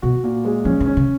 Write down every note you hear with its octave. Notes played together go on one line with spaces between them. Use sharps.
B2 F#4
A#2
G#3
F3 C#4
D#3
C#4
C#3